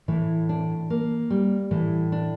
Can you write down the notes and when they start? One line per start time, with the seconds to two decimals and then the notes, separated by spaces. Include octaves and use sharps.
0.08 A2 E3
0.49 D4
0.90 A#3
1.30 G3
1.71 A2 E3
2.12 D4